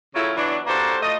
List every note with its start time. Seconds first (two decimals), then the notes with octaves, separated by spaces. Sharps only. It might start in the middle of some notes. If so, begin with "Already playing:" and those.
0.15 C#3 F#3 A3 C#4 E4 F4
0.37 E3 F#3 B3 D4
0.67 A#3 D4 F#4 G4 A4 C5
1.02 A3 F4 D#5